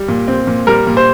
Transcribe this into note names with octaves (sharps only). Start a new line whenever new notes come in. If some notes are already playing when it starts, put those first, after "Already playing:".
Already playing: G3
A#2
C4
A#2
G3 A#4
A#2
C5